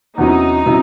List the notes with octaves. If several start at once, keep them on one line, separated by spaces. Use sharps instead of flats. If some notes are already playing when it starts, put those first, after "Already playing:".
E2 C3 F#3 C#4 D#4 E4
C3 F#3 C#4 E4